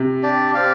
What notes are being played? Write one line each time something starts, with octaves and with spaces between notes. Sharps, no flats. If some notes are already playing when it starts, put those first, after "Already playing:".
Already playing: C3
D4 G4 D5
C4 G4 D5 F5